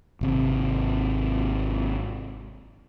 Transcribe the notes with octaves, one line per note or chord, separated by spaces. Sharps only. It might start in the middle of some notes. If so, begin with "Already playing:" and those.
G#1 C3